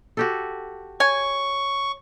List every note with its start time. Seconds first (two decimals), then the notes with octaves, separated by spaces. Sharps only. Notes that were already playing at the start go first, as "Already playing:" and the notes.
0.17 F#4 G4 A4
1.00 C#5 G#5 C#6